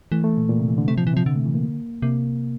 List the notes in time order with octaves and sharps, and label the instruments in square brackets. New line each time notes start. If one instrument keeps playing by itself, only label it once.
[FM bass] E3 [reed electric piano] A3
[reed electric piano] A3
A#2
A#2
C3
E3
D3
[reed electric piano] C3 [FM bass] A3
[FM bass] F3
[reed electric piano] A#2
[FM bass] E3
[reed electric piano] C3 [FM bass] F3
[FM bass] D3
[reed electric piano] A3
E3
A#3
[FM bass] C3 [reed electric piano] A#3